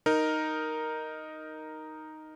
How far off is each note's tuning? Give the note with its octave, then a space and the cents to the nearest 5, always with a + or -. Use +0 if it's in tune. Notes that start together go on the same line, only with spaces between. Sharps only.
D#4 +0 A#4 +0